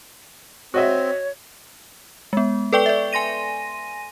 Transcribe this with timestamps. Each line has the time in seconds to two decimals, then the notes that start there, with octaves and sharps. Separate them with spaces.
0.74 C4 F#4 C#5 D#5 E5
2.33 G#3 B3
2.73 A4 B4 D5 G5 C#6 G7
2.86 D5 E5
3.13 G#5 C6 A#6 D#7